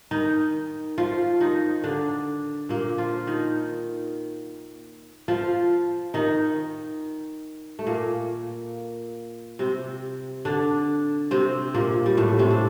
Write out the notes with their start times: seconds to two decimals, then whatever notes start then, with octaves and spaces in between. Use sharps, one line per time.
0.11 D#3 D#4
0.98 F3 F4
1.40 D#3 D#4
1.83 D3 D4
2.69 A#2 A#3
2.98 F3 F4
3.27 D#3 D#4
5.28 F3 F4
6.14 D#3 D#4
7.79 A3
7.86 A#2 A#3
9.59 C3 C4
10.45 D3 D4
11.31 C3 C4
11.74 A#2 A#3
12.06 G3
12.17 A2 A3
12.39 C3 C4
12.50 D4